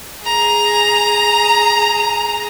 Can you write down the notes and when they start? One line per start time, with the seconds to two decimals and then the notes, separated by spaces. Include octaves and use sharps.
0.23 G#4 A#5